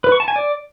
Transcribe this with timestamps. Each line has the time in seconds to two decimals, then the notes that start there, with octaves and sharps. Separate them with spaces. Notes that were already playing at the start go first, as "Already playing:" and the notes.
0.04 B4
0.12 C#6
0.20 A5
0.28 G#5
0.36 D5